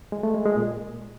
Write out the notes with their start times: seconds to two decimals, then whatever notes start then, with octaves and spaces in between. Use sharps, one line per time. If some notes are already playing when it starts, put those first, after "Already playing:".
0.12 G#3
0.23 A3
0.34 G#3
0.46 G#3
0.57 A#2